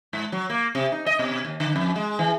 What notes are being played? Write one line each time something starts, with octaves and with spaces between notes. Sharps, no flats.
G#2
F#3
A#3
C3
D#4
D#5
B2
D#2
D3
F2
G#3
E3